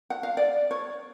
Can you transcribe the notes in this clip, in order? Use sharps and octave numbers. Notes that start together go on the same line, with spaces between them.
F#5
F5
D5
C#5